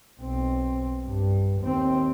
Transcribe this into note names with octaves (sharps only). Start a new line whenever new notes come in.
B1 C4
G2
D#2 C4